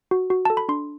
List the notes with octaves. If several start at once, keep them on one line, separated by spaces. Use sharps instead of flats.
F#4
F#4
A4 A5
B5
D4 C6